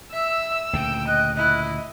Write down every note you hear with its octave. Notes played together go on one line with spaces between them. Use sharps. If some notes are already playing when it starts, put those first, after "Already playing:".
E5 E6
D2 A#2 C#3 G5
D#5 F#6
E4 D#5